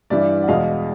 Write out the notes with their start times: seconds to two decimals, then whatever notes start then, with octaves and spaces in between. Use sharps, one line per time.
0.10 G2 E3 G3 D5 E5
0.42 F#5
0.48 E2 B2 G#3 D#5 F5